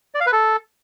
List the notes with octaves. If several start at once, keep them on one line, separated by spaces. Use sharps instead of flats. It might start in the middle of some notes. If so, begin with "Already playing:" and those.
D5
F5
B4
A4